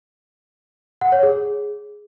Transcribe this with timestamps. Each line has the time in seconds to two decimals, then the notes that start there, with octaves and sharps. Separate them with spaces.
1.01 F#5
1.12 C#5
1.23 G#4